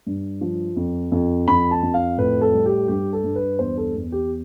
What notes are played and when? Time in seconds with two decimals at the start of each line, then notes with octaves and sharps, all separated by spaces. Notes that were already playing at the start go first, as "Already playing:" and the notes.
0.07 G2
0.41 F3
0.76 F2
1.12 F2
1.48 F2 B5
1.71 A5
1.83 F2
1.94 F5
2.18 A2 B4
2.41 A4
2.53 G3
2.66 G4
2.88 G2 G4
3.13 A4
3.24 G2
3.36 B4
3.59 E2 C5
3.78 A4
3.95 E2
4.12 G4